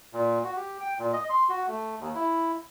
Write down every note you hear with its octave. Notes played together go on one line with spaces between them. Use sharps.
A#2
F#4
G4
G5
A#2
D#5
C6
F#4
A3
D#2
E4